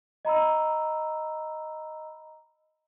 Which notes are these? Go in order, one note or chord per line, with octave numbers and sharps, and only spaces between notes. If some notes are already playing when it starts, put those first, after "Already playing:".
D#5 A#5 B5 E6